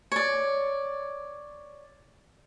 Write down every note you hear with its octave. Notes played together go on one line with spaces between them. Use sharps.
C#5 D5